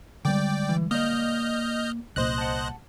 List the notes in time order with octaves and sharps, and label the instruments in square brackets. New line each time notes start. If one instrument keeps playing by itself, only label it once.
[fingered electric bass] D3 G3 G#3 [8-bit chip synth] D5 G5
[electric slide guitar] E3
[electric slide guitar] A#3 D5 [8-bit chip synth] D#5 F6 G6
[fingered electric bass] C2 A#2 [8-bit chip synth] C5 D#5 F#6
[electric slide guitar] F#5 A5